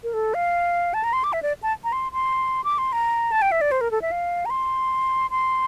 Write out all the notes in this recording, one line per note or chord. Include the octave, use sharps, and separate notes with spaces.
A#4
A4
F5
A5
A#5
C6
D6
E5
D5
A5
A#5
C6
C6
D6
C6
A#5
A5
G5
E5
D5
C5
A#4
A4
E5
F5
A#5
C6
C6